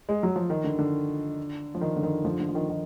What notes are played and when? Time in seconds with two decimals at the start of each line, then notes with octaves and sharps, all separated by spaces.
0.09 G#3
0.23 F#3
0.36 F3
0.50 D#3
0.64 D3
0.79 D3
1.75 F3
1.81 D#3
1.96 D3
2.03 D#3
2.25 D3 F3
2.40 D3
2.49 F3
2.55 D#3
2.69 D#3